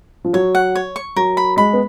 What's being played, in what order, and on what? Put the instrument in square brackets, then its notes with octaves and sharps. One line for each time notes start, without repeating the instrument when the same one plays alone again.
[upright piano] F3
[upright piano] F#3 [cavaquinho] C#5
[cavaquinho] F#5
C#5
C#6
[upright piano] F#3 [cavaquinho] A#4
[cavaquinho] B5
[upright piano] G#3 [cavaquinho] B5
[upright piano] B3